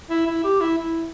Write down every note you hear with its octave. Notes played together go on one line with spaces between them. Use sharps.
E4
E4
G4
E4
E4